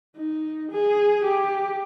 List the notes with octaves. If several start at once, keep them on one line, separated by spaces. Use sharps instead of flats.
D#4
G#4
G4